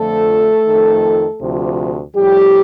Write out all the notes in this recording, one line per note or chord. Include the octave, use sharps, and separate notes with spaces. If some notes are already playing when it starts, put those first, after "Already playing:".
Already playing: F2 D3 F3 A3 A4
F2 D#3
D2 C3 F3
A2 F3 G3 G4